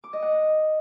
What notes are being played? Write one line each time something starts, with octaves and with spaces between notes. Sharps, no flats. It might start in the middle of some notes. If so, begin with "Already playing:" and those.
D6
D#5
F#5